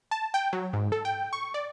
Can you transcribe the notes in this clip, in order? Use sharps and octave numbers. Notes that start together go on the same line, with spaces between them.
A5
G5
F#3
G#2
A4
G5
C#6
D5